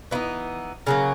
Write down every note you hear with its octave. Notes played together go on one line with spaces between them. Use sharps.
E3 B3 D#4 E4
C#3 F#3 A#3